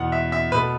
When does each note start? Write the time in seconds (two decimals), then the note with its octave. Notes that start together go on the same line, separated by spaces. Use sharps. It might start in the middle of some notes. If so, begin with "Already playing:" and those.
Already playing: E2 B2 B3 F#5
0.12 E5
0.32 E5
0.52 B2 A3 B4